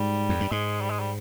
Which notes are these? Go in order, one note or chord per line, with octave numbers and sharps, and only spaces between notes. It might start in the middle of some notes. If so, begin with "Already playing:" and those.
Already playing: G#2 G3
F2
G2
G#2 G#3
G3
G#3
G3